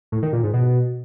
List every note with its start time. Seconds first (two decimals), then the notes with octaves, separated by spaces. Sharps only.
0.12 A2
0.22 D#3
0.33 A#2
0.43 G#2
0.54 B2